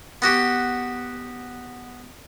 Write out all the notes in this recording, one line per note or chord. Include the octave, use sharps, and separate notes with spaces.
B3 F#4 G4